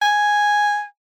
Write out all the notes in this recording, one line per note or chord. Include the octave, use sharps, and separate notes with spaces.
G#5